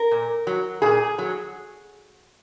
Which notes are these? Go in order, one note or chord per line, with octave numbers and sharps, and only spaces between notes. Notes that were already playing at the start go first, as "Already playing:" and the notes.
Already playing: A#4
A#2
F#3
A#2 G#4
F#3